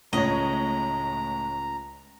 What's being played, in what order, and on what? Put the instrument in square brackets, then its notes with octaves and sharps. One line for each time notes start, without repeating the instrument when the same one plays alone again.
[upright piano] C#2 [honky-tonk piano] A2 C#5 [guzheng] D#5 [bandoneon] A#5